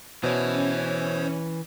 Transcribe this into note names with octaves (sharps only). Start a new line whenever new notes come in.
B2 E3 C#4 C5 C#5